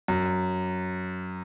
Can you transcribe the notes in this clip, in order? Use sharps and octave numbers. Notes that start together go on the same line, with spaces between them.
F#2